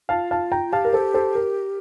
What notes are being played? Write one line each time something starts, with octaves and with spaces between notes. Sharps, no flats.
F4 F5 A5
F5 A5
G5 A#5
G4 F5 A5
A#4
A4 C5
A4 C5
A#4